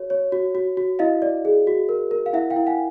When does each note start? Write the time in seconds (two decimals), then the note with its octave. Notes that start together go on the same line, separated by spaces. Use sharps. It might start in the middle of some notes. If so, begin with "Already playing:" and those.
Already playing: F#4 C#5
0.10 C#5
0.32 F#4
0.55 F#4
0.77 F#4
0.99 E4 D#5 F5
1.22 D5
1.45 G#4
1.67 F#4
1.89 A#4
2.11 A#4
2.26 F5
2.33 E4 E5 F#5
2.50 F5 G5
2.56 E4
2.67 F#5 G#5